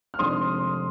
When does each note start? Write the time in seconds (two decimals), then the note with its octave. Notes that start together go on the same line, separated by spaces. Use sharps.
0.14 F6
0.19 F1 F2 D#3 G#3 D4 C6 D#6